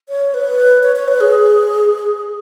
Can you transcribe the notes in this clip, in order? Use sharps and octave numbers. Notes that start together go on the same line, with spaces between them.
C#5
B4
C#5
C#5
B4
G#4